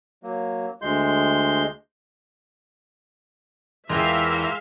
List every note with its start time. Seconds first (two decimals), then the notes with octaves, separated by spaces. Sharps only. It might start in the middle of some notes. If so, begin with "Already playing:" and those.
0.23 F#3 A#3
0.82 D2 G#3 C6 G6
3.89 E2 G#3 F4 A#4 E5 F5 G5 C6